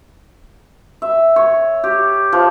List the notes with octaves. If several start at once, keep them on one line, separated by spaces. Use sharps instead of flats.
E5
C#5
G4
F3